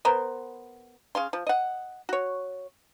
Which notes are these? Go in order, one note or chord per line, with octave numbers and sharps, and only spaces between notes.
B3 A#4 C5
C#3 F5 C6
F3
D#5 F#5
F#4 C#5